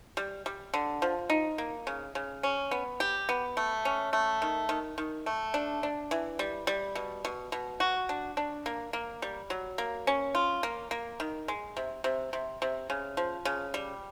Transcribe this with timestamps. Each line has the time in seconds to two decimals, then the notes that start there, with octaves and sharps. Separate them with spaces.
0.17 G3
0.46 G3
0.74 D3
1.02 F3
1.30 D#4
1.58 A#3
1.87 C#3
2.15 C#3
2.43 C#4
2.71 B3
3.00 G4
3.29 B3
3.57 A3
3.85 C#4
4.13 A3
4.42 D#3
4.69 D#3
4.98 D#3
5.26 A3
5.54 D4
5.83 D4
6.11 E3
6.39 G3
6.67 G3
6.95 B2
7.25 B2
7.52 B2
7.80 F#4
8.09 D4
8.37 D4
8.66 A#3
8.93 A#3
9.22 G3
9.50 F#3
9.78 A#3
10.07 C#4
10.35 F4
10.63 A#3
10.91 A#3
11.20 D#3
11.48 G#3
11.77 C3
12.04 C3
12.33 C3
12.62 C3
12.90 C#3
13.17 F3
13.45 C#3
13.74 G3